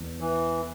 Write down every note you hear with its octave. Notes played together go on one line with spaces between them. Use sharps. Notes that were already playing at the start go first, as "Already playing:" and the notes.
Already playing: E2
E3